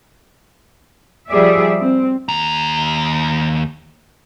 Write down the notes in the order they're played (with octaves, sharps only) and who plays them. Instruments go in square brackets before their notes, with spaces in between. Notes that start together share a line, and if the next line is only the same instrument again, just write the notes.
[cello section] F3 G3 G#4 D5 E5
C4
[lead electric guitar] D#2 A#5